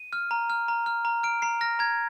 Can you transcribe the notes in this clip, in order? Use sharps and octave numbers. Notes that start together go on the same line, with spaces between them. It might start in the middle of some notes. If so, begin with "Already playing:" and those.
Already playing: D#7
F6
A#5
F6
A#5
F6
A#5
F6 D7
A#5 C7
F6 A#6
A#5 G#6